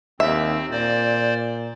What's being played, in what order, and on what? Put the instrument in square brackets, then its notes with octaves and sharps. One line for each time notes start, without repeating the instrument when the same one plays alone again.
[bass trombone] D#2 [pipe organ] C4 [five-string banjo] E5
[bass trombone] A#2 [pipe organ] C5 D5